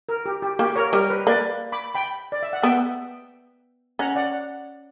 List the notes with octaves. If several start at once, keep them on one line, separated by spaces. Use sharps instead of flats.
A#4
G4
G4
A#3 G4
A#4 C#5
G3 A#4
B4
A#3 B4 D5
B5 D6
G5 B5
D5
E5
F#5
B3 E5 G5
C#4 F#5 A#5
D5 F#5